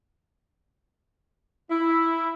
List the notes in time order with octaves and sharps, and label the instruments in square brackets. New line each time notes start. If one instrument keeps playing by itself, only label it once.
[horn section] E4